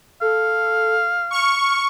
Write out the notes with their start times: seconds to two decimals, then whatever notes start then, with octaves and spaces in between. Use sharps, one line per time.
0.21 A4 F5
1.31 C#6 F6